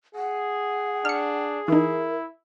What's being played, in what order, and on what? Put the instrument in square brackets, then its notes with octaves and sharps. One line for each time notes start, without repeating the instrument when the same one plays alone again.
[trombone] G#4 [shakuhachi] F#5
[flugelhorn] D4 [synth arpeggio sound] F6 C#7
[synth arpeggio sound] E3 D#4 [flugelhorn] E4 [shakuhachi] A#4